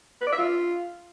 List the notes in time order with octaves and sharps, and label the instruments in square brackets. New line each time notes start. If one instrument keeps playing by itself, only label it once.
[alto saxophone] B4
D5
E5
F4